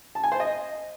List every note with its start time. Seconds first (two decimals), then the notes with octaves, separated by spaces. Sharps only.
0.15 A5
0.23 G#5
0.32 C5
0.40 D#5